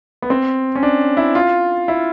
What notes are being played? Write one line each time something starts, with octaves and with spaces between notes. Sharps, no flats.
B3
C4
C#4
D4
E4
F4
E4